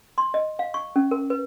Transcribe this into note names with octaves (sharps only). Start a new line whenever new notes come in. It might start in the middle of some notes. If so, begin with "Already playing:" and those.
C6
D#5
F5
C#6
C#4
A#4
B4